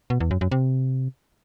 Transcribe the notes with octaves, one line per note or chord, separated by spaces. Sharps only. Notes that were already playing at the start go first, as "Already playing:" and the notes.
B2
E2
F#2
F#2
C3